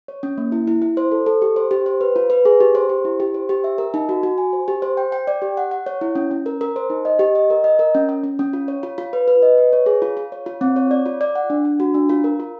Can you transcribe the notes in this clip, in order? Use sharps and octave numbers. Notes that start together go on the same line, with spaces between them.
C#5
C#4
A#3
E4
E4
E4
C5
A4
A4
G4
C5
G4
C5
B4
F4
B4
G#4
G4
C5
G4
E4
G4
C5
G4
E5
A#4
D#4
F#4
F#4
G#5
C5
G4
C5
G5
G5
D5
G4
F#5
F#5
C#5
E4
C#4
C#4
A#4
A#4
C5
D#4
D#5
G4
D#5
A#4
D#5
A#4
C#4
C#4
C#4
C#4
F4
C#5
F4
F4
B4
B4
D#5
B4
C#5
G#4
F4
F4
C#5
F4
C4
C#5
D5
F4
D5
F#5
D4
D4
F#4
D4
F4
A#4
F4